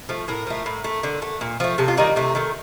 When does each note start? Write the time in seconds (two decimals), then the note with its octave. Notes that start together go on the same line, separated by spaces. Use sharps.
0.09 F3 A3
0.28 A2 A#4
0.47 F3 A3
0.66 A2
0.84 A3
1.03 D3
1.22 A3
1.41 A#2
1.60 F3 A3
1.78 C3 A4
1.88 F4
1.97 D#3 G3 D#4
2.16 C3 A3
2.35 D#3 A3